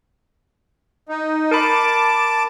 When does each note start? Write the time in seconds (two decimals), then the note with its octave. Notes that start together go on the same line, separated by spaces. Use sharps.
1.09 D#4
1.51 A#4 A5 B5 D6